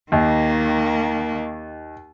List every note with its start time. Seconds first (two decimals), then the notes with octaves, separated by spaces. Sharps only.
0.12 D#2 D#3 A#3